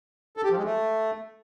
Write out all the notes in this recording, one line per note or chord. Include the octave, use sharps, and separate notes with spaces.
A4
G4
F3
G#3
A3